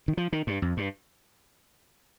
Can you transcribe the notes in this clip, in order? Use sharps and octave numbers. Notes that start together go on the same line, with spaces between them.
D#3
F3
D#3
G2
F2
G2